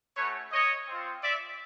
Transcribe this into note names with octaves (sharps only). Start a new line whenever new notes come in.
A3 C#4 F#4 B4 C#5
C#5 D#5
C4 F4
D5 E5